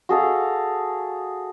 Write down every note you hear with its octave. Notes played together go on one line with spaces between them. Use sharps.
F#4 G#4 A4 F5